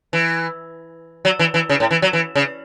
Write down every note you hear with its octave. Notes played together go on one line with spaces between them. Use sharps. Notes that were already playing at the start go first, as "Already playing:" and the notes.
E3
F#3
E3
E3
C#3
A2
E3
F#3
E3
C#3